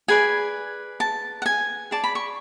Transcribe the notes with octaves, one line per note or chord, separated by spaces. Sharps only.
G#4 B4 D5 G#5
A5
F#5
G#5
G#4 D5 A5
B5
C#6